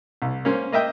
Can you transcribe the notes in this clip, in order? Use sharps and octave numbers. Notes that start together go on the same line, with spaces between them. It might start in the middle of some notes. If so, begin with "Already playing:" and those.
C2
A#3 C#4 C5
A#3 D#5 E5 G5